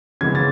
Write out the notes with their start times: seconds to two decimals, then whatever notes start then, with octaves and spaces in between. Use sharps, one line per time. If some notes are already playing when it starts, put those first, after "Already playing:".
0.21 C#3 E3 G#3 B3 G#6
0.35 A6